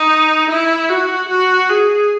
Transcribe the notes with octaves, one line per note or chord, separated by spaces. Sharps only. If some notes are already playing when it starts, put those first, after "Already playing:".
Already playing: D#4
E4
F#4
F#4
G#4